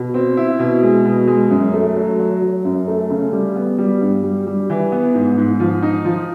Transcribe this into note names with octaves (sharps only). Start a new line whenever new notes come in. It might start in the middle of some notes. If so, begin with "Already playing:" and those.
Already playing: B2
C4
E4
B2
G#3
B2
G#3
F#2
A3
F#3
F#3
F#3
F#2
A3
C#3
G3
B3
G3
G2
G3
G3
E3
B3
G#2
G#2
F3
D#4
F3